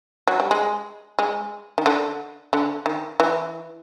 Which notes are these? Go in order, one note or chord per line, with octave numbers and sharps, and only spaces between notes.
F#3
G3
G#3
G#3
D#3
D3
D3
D#3
E3